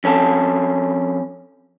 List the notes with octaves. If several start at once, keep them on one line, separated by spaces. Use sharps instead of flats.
F2 C#4 A4